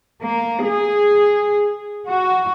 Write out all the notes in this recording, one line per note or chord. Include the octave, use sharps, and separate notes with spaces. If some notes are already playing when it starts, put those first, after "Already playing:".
A#3
G#4
F#4